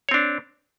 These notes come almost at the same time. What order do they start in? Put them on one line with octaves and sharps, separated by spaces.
C#5 C4 D4